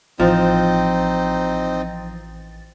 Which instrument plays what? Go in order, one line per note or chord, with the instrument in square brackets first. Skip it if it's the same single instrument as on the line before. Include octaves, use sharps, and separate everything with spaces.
[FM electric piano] A1 E3 A6 [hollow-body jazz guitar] F3 [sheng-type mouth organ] C4 D#4